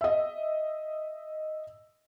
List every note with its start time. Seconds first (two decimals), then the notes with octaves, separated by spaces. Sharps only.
0.01 D#5 E5